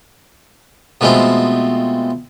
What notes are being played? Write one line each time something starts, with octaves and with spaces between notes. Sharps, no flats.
B2 F3 G#3 A3 C4